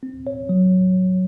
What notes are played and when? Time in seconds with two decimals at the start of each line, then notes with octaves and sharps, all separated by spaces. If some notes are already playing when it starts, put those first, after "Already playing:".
0.03 C4
0.27 C#5
0.49 F#3